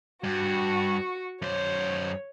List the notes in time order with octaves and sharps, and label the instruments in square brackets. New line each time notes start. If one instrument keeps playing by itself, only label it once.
[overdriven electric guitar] G2 [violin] F#4 C#6
[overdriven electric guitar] F#2 C5 [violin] C#5